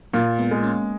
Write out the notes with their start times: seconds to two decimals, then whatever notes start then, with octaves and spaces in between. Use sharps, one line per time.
0.13 A#2 F#3 A#3
0.39 G#3 B3
0.51 G#3
0.63 A#3 C#4